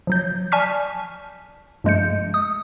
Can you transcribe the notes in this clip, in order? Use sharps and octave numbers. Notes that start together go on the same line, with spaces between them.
F3 F#3 G6
D5 G#5 A5 C#6 F6 B6
G2 F3 G#3 A3 G6 C#7
D#6